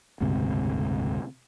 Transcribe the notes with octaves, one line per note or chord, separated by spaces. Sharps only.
F#1 D2 G#2 C3